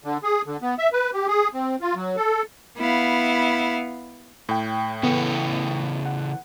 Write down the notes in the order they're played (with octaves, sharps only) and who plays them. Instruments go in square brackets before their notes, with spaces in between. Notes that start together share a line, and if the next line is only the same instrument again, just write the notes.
[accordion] D3
G#4
D3
B3
E5
B4
G4
G#4
C4
F4
F#3
A4
[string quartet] B3 E4 F5
[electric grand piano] A2 G5
[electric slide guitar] C#3 E3 A4 [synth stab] B3
[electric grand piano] F#5